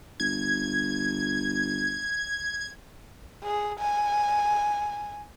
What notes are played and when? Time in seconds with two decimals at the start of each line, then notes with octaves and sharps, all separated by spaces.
0.20 G1 G#6
3.43 G#4
3.80 G#5